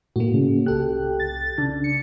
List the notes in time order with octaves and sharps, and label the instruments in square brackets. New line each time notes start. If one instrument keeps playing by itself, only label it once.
[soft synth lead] A2 [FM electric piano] A#3 F#4
[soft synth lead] C#3
[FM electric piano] C2 A4 F#6 [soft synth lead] G4
[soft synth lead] A6
[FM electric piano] C#3 [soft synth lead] D4
[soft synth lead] C#7